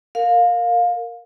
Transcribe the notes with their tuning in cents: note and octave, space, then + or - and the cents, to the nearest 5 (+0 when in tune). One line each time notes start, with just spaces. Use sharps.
A#4 -15 F5 +20